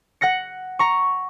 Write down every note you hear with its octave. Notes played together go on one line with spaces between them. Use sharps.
F#5 F#6 A#6 C#7
A#5 C#6